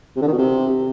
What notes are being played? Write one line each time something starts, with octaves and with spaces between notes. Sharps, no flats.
C3
D3
D#3
B2
C3